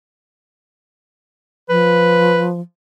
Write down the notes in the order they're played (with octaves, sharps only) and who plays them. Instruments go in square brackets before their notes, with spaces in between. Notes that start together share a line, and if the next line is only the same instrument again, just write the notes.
[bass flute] F3 [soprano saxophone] B4